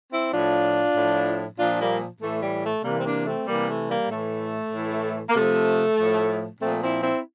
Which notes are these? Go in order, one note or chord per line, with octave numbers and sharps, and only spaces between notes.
C4 E4
A2 F3 D4 F4
A2 F3
A#2 F3 D4 F4
G3 A#3
A2 E3 A3
G3
A3
C3 E3 G3 A#3
C4
A#3 D4
A3 C4
C3 E3 G3 A#3
A3
G3 A#3
A2 E3 A3
A2 E3
A#3
C3 F3 A3
A2 F3
A#2 F3 A3 C4
C4 E4
C4 E4